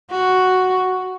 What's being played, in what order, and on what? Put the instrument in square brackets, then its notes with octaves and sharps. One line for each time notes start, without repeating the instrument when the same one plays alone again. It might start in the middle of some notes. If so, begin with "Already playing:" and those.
[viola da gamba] F#4